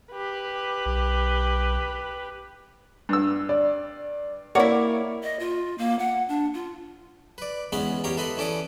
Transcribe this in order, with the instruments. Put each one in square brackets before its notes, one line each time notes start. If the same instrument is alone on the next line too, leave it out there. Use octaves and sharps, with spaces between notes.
[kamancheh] G4 B4
[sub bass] B1
[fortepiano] G2 E6
[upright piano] D5
[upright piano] A#3 [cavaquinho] E4 F#4 [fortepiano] C#5 D5
[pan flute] D#5
F4
A#3
F#5
D4
F4
[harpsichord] B4 D5
E2 G#3 B3 C#4 B5 C6
E2 G4 C#5 F5 G5 A#5
A4 B4 D#5 B5 C6
E3 C#4 A4 D5 D6 D#6